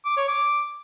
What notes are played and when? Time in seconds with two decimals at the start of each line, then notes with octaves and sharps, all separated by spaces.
0.05 D6
0.17 C#5
0.28 D6